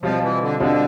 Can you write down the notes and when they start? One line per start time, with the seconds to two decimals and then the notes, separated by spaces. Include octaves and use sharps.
0.02 B2 F3 G3 C4 F4
0.22 E3
0.40 D3
0.59 B2 D3 G3 C4 F4